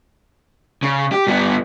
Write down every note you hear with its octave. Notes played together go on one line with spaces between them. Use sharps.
C#3
G4
G2 B3